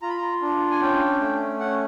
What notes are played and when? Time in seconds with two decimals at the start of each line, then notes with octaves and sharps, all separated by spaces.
0.02 F4 A#5
0.09 B5
0.17 A#5
0.42 D4
0.71 G#5
0.81 C#4 G5
1.21 A3
1.59 C#4 F#5